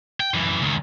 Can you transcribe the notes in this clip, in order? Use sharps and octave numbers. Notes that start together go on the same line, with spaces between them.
G5
F#2 E3
C#2 D#3